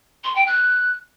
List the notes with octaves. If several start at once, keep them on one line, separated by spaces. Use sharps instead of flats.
C6
G5
F#6